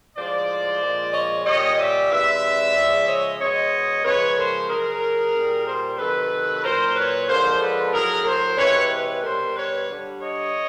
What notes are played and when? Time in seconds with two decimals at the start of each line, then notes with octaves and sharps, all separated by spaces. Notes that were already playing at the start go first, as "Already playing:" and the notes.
0.16 A2 F3 G#3 C5 D5
0.81 A#2 F3 G#3
1.13 C#5 D#5
1.46 A#2 G3 C#5 D#5
1.78 D5 E5
2.10 C3 E3 G#3 D5 E5
2.75 C#3 F3 G#3
3.08 C#5 D#5
3.40 B2 G#3 C#5 D#5
4.05 C#3 F3 G#3 B4 C#5
4.37 A#4 C5
4.69 C#3 F#3 G#4 A#4
5.34 A#2 G3
5.66 A#4 C5
5.98 C3 D#3 F#3 A4 B4
6.64 A#2 F#3 A#4 C5
6.96 B4 C#5
7.28 D3 F3 G#3 A#4 C5
7.61 A4 B4
7.93 A2 F#3 G#4 A#4
8.25 A#4 C5
8.58 C3 E3 G#3 B4 C#5
8.90 B4 C#5
9.22 B2 G3 A#4 C5
9.55 B4 C#5
9.88 D3 G3
10.20 C#5 D#5